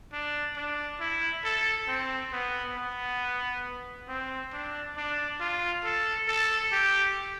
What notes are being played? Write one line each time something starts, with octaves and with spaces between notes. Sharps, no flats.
D4
D4
E4
A4
C4
B3
B3
C4
D4
D4
F4
A4
A4
G4